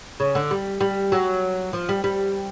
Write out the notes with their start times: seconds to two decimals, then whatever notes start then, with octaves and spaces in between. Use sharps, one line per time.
0.20 C#3
0.35 D3
0.51 G3
0.81 G3
1.12 F#3
1.73 F3
1.89 G3
2.04 G3